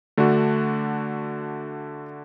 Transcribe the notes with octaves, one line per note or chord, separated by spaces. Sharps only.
D3 A3 D4 F#4